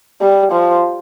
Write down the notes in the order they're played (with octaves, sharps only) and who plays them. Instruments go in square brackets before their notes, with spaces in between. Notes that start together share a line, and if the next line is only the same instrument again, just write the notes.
[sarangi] G3
F3